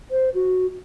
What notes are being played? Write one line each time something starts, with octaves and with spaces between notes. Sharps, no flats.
C5
F#4